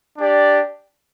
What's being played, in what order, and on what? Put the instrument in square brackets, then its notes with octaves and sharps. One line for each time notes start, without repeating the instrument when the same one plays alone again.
[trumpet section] D4 G4 D5